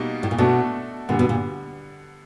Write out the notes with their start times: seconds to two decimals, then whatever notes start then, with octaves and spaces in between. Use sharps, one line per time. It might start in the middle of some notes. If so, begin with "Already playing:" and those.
Already playing: B2 G3 A#3 D#4 F#4
0.23 A2
0.31 A#2
0.38 B2 A3 D4 F#4 A4
1.09 A#2 D3 G3 B3
1.19 B2
1.29 A#2